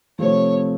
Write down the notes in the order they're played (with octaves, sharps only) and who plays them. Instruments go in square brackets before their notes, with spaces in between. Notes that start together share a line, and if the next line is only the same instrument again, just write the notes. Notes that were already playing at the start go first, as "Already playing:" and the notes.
[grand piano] C3 F3 A3 C4 [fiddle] C#5